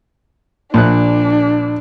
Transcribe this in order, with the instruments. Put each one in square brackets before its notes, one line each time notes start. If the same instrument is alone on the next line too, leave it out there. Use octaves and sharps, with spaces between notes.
[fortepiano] A#1 F#6 [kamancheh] D4